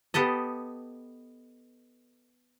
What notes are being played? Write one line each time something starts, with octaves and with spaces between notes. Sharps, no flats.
B3 G4 A4 D#5